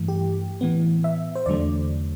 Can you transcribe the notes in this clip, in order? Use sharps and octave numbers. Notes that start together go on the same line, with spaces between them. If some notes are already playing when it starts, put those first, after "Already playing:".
Already playing: G2 E3 A3
G4
A2 E3 B3
E5
C5
E2 D3 F#3 A3 D5